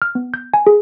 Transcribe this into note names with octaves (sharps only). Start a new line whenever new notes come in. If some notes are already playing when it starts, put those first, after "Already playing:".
F6
B3
G6
G#5
G#4